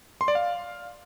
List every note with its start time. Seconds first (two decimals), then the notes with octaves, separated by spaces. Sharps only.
0.21 C6
0.28 D5
0.35 F5